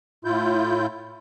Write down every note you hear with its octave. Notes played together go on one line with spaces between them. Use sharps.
A2 E4 F4 G6